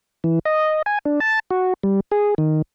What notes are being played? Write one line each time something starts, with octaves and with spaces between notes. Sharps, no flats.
E3
D#5
G#5
D4
A5
F#4
G3
G#4
D#3